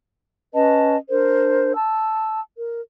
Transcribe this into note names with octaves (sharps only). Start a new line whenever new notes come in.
C#4 B4 D#5 A5
D4 A#4 C5
A5 E6
A#4